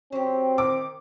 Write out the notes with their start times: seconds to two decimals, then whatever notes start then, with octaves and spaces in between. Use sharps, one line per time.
0.12 F#3 C4 G4
0.58 D#3 D6